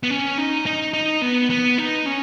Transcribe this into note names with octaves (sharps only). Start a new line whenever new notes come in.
B3
C#4
D#4
D#4
D#4
B3
B3
D#4
C#4